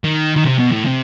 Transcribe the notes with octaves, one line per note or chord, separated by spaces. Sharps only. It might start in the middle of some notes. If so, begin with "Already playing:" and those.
D#3
D#3
C3
B2
A2
C3